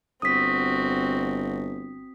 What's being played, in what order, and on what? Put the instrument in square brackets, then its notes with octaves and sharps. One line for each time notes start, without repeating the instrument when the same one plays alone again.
[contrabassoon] G1 [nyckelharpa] C4 F#4 [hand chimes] D#6 B6